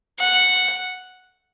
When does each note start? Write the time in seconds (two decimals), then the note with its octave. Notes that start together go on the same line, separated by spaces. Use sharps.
0.20 F#5